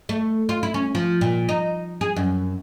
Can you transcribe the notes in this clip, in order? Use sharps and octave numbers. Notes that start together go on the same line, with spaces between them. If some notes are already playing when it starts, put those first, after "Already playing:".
A3
F4
E4
C#4
F3
A#2
D#4
G#4
F#2